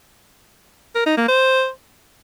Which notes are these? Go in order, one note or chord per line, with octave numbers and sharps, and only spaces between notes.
A#4
D#4
A#3
C5